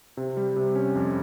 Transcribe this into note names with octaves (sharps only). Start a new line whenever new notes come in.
C3
G3
C3
C#4
F2